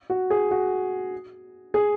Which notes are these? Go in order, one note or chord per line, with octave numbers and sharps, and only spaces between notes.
F#4
G#4
F#4
G#4